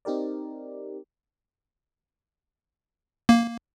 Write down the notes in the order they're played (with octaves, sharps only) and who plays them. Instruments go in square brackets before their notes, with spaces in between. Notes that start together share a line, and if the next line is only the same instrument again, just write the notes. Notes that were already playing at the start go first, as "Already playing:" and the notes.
[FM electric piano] C4 D#4 G4 A#4 D5
[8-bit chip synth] A#3